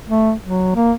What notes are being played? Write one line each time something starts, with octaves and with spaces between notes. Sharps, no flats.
A3
F#3
A#3